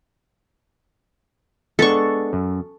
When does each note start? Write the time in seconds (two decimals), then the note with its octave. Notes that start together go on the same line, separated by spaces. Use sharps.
1.79 G#3 B3 D4 A4 C#6
2.33 F#2